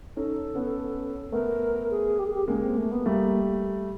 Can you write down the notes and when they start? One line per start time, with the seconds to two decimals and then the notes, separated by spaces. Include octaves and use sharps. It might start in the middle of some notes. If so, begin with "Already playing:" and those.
0.17 C#4 D#4 A4
0.55 B3 C#4
1.32 A3 B3 A#4
1.91 G#4
2.19 G4
2.27 G#4
2.34 G4
2.48 G#3 A#3 C#4
2.62 C4
2.77 A3
2.91 B3
3.05 G3 A3 A#3